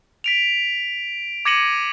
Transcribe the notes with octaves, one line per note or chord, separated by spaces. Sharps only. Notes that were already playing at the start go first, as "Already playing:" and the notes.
B6 D7 F7
D6 G#6 A#6 C#7 D#7 F#7